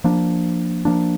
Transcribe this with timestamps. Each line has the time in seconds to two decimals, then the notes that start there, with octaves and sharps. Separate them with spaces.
0.04 F3 A#3 D4
0.85 F3 A#3 D4